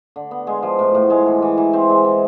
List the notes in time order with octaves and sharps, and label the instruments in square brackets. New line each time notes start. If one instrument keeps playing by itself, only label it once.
[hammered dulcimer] D3
B3
G#3
F3
A2
A2
G#3
E3
E3
E3
C4
G#3
E3